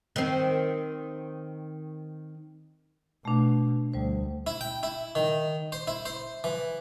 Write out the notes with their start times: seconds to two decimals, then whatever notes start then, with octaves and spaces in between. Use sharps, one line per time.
0.16 D#3 C4
3.25 B2 A3 D4
3.94 D2 G3 C5
4.47 E4
4.61 G5
4.83 E4
5.15 D#3
5.72 C5
5.87 E4
6.06 C5
6.44 E3